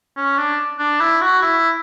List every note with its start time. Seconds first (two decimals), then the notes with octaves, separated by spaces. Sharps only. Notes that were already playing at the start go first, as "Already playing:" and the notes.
0.17 C#4
0.37 D4
0.79 D4
1.01 E4
1.21 F#4
1.42 E4